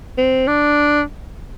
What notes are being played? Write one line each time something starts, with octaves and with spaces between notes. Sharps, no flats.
C4
D4